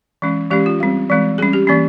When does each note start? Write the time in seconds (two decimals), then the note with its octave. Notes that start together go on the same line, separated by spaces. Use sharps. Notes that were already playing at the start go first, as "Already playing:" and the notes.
0.22 E3 G#3 C#4
0.51 E3 G#3 C#4 G4
0.66 F4
0.80 G3 C4
1.10 E3 G#3 C4
1.38 G3 C#4 G#4
1.53 G4
1.67 E3 A#3 C#4